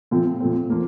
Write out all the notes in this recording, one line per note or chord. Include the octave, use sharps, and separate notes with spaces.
A#2 F3 A3 C4
A#2 F3 A3 C4
F3 A#3